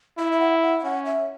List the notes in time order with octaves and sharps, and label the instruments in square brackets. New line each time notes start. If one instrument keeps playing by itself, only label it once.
[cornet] E4 [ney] E5
[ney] E5
F#5
F#5
E5
[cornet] C#4 [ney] F#5
[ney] E5